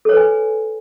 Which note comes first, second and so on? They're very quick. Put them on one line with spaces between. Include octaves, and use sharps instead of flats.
A4 C#5 B4 G#5